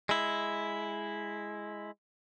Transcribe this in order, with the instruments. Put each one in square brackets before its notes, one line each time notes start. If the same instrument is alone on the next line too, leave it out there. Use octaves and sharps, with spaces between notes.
[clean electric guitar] G#3 E4